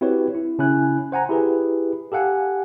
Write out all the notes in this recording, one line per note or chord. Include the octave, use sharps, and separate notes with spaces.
C4 E4 F#4 G4 B4 C#5
E4
C#3 C#4 E4 G#5 F#6
C5 F#5 G#5 A#5
E4 G4 G#4 B4
G4 A4 F5 F#5 G#5